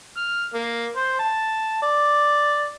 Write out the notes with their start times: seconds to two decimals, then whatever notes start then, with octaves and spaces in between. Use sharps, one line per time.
0.17 F6
0.54 A#3
0.96 C5
1.19 A5
1.82 D5